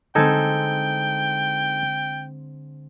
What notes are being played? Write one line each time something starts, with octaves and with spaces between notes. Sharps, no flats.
D3 G#3 C4 D#4 A4 G5 G#5